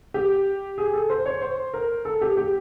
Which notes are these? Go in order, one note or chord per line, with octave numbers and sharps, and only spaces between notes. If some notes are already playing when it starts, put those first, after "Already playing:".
G4
G#4
A4
C5
C#5
C5
A#4
A4
G4
G4